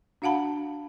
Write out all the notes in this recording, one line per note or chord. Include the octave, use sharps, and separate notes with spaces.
D4 F#4 F5 F#5 A5 B5